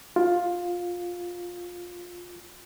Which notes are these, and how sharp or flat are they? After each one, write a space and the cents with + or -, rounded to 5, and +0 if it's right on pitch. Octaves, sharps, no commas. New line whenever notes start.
F4 +15